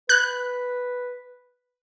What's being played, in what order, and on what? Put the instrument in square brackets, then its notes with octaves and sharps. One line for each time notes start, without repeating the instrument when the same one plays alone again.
[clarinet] B4 [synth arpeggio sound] F#6